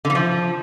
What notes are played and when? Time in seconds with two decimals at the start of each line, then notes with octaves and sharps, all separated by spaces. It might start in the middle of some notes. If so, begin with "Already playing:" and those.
0.05 D3
0.10 E3
0.15 F3